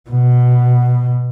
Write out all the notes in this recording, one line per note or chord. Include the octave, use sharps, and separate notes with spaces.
B2